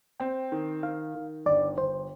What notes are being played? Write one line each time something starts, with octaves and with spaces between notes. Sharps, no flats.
C4 G5
D#3
D#3 F5
D#3
G1 D5
G1 C5